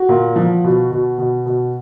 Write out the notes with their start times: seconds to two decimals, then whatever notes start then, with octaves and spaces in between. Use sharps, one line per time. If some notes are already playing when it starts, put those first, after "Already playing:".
Already playing: F#4
0.09 A#2
0.36 F3
0.64 B2
0.91 B2
1.18 B2
1.46 B2